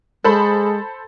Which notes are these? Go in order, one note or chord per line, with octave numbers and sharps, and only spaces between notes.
G#3 A4 C5 B5